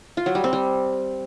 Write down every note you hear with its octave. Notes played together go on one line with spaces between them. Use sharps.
F4
F#3
G3
C4
G3